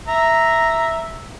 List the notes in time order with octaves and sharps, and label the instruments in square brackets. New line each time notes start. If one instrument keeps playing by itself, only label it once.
[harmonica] E5 A#5